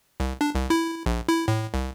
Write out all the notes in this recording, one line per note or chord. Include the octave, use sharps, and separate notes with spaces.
C2
D4
C2
E4
A#1
E4
A2
C2